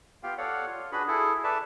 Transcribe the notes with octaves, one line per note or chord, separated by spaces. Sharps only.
B3 F4 G4 F5 G5
A4 C#5 D5 F5 F#5
F4
D4 F#4 G#4 B4 B5
E4 G#4 A4
A4 B4 D5 E5 A5